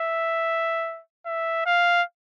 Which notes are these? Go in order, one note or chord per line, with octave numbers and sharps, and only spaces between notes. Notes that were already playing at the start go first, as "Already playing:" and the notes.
Already playing: E5
E5
F5